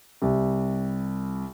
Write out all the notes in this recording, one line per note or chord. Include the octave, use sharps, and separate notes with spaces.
C2